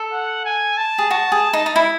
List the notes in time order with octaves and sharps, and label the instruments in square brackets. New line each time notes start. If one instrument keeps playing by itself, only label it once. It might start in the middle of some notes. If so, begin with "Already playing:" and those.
Already playing: [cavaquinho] A4
[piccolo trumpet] F#5
G#5
A5
[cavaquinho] G#4
[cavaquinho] F#4 [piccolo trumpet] A5
[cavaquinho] G#4
D#4
D#4
E4